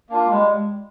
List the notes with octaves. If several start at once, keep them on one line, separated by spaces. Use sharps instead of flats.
A#3 D4 F4
G3 G#3